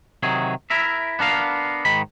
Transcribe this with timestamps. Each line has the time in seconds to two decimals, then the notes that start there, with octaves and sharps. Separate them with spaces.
0.23 C3 D#3 F#3 G#4
0.70 E4 A#4 E5
1.19 B3 D4 A#4 F5
1.85 G#2 D#3 B5